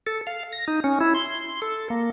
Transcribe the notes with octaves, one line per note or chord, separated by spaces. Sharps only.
A4
F5
A#6
D#4
C#4
E4
C6
A4
A#3